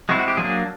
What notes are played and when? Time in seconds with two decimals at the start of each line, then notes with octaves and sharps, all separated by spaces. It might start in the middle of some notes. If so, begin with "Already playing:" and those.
0.09 G#3 C4 E4 F#4
0.19 F#4
0.28 G4
0.37 F#3 A#3 D4 G#4